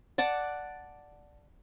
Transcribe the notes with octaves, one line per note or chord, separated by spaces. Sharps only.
D5 F#5 A5